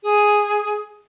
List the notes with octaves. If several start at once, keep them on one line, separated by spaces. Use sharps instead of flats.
G#4